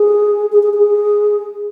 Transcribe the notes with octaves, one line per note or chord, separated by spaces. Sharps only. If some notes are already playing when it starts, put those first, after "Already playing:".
Already playing: G#4
G#4
G#4
G#4